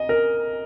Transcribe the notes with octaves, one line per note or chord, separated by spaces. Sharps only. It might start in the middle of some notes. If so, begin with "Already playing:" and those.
Already playing: D#5
A#4